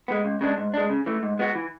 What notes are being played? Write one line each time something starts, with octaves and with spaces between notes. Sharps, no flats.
G#3 B3
C#2
C#3 G#3 D4
G#2
G#3 D4
C#3
E3 A3
G#2
G#3 B3 F#4
E3